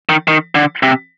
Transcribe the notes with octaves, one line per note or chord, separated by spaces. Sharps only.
D#3
D#3
D3
C3